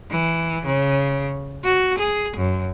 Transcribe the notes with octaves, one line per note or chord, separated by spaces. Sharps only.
E3
C#3
F#4
G#4
F#2